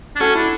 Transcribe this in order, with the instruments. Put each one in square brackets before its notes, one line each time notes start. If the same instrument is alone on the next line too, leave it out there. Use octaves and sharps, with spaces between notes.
[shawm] D4
[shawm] C#4 [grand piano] F#4 A4
[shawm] D4 [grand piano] E4